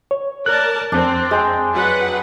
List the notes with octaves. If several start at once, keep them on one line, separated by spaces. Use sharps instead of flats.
C#5
A#4 D5 A5 F#6
F2 C4 D4
G#3 G5
F#3 B4 F#5